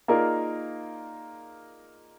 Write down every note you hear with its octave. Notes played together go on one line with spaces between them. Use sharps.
A#3 D#4 F4 G#4 A#4 D5